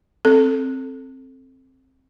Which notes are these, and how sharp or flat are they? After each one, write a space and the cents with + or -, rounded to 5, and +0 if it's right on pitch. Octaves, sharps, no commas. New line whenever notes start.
C4 +15 A4 +0